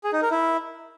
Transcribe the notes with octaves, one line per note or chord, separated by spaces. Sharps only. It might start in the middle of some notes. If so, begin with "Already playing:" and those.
G#4
D#4
A#4
E4